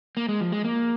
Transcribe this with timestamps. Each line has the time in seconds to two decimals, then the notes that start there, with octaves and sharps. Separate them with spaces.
0.17 A#3
0.29 G#3
0.41 F3
0.52 G#3
0.64 A#3